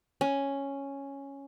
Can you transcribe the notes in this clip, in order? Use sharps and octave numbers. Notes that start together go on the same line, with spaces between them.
C#4